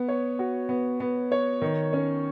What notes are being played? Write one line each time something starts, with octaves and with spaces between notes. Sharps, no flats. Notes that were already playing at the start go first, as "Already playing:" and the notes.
Already playing: B3
C#5
F#4
B3
B3
C#5
D#3
C#4